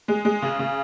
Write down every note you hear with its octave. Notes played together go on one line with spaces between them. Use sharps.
G#3
G#3
C#3
C#3